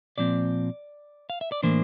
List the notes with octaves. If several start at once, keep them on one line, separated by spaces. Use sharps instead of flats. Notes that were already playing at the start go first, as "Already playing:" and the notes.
A#2 F3 C4 D5
F5
E5
D5
A2 E3 A#3 D4 C5